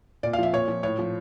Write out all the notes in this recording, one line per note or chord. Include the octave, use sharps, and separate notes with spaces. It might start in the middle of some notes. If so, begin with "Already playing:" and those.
A#2 D5
F5
F3 E5
A#2 C#5
F3
A2 C#5
F3